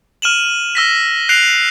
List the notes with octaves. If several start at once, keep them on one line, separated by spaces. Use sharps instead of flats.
F6 D#7 E7 F#7
E6 A#6 B6
F#6 C7 D7 F7